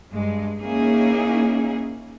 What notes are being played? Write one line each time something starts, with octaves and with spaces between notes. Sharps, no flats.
G2 G#3
A#3 C#4 D#4 E4 G#4